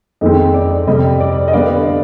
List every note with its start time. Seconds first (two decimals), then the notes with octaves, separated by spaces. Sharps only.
0.21 F2 D#3 G#3 C4 D#5
0.54 D5
0.87 F2 C3 G3 C4 D#5
1.20 D5
1.48 D#5
1.53 D3 G3 B3 D5 F5